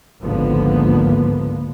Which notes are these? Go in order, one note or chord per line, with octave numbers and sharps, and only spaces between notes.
G#1 C#2 D3 F3 A#3 B3